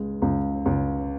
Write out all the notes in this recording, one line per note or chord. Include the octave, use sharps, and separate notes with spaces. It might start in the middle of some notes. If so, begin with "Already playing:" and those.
Already playing: C#2 G#3
C#2
C#2